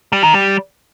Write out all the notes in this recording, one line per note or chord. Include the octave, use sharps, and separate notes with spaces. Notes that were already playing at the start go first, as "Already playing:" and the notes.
G3
D#3
G3